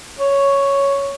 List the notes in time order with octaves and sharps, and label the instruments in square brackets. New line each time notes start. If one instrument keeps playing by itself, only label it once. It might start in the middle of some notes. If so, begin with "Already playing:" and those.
[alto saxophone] C#5